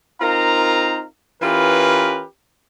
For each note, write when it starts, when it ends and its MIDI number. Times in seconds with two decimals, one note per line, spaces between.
0.21 1.04 60
0.21 1.04 63
0.21 1.04 65
0.21 1.04 70
0.21 1.04 77
0.21 1.04 82
1.42 2.24 52
1.42 2.24 61
1.42 2.24 65
1.42 2.24 67
1.42 2.24 70
1.42 2.24 71